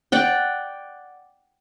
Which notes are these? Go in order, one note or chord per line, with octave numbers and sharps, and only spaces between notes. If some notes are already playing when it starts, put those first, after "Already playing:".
D5 F#5 G5